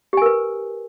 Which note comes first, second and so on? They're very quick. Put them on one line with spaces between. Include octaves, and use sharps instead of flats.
G4 G#5 A#4 B4